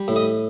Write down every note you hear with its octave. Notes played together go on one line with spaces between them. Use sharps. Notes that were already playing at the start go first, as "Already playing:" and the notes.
Already playing: G3
A2
D#5